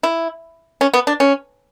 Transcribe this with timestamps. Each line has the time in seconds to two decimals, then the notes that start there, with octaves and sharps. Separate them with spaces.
0.03 E4
0.81 C#4
0.94 B3
1.07 D4
1.20 C#4